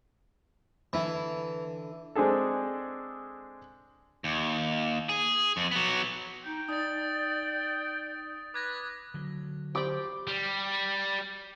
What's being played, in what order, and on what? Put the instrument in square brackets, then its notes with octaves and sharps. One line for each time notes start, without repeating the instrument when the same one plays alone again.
[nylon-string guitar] D3 E4 [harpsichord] E3
[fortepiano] G#3 C4 D4 G#4 A4
[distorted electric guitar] D#2
G#4
F2
F#3 B3
[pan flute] D#4 [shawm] G5
[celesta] D#4 [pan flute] D5 [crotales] D#6 A6
[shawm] B4 [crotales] D6 G#6 A#6
[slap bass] D3 F#3
[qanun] G4 D5 G5 [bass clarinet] C5 [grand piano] B5 D6
[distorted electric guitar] G3